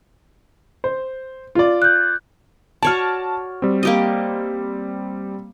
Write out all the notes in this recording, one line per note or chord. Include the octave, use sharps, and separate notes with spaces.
C5
F4 D5
F#6 G6
F#4 C#5 D5 A5 F6
G3 C4
A#3 G4 D#5